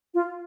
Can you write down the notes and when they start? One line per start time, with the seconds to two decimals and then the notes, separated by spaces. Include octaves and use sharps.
0.14 F4